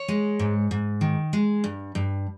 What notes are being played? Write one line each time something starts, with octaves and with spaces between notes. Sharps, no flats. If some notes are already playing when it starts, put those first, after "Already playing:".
Already playing: C#5
G#3
G#2
G#2
D#3
G#3
G2
G2